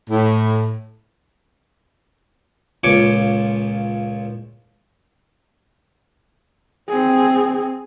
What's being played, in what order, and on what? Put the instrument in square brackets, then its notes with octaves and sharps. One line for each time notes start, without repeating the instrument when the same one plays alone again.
[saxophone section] A2
[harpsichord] C#2 A#2 F3 C#5 C#6 D6
[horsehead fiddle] C4 G#4